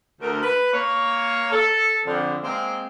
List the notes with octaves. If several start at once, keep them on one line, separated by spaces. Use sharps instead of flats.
D2 A#4
B4
A#3 C#5
A4
F2 D3
G#3 A#3 C4